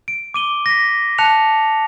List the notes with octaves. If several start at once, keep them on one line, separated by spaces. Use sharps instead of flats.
D7
D6 D#7 G7
A#6 B6
A5 F#6 C#7 F7